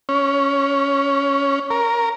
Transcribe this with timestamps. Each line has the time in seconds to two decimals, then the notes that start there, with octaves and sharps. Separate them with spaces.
0.09 C#4
1.70 A#4